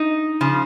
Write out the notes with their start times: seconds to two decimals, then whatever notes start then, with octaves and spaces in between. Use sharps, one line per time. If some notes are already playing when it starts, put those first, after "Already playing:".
Already playing: D#4
0.41 C#3 F3